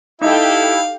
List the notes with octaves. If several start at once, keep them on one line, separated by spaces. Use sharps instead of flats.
D#4 E4 G4 A4 F5 G5